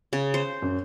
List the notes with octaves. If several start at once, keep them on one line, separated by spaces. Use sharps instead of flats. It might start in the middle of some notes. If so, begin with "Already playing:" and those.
C#3
C5
F#2